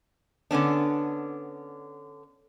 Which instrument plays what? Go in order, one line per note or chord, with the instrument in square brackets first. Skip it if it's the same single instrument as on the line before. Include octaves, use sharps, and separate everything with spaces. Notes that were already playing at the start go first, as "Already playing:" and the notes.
[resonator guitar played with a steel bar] D3 B3 C#4 D4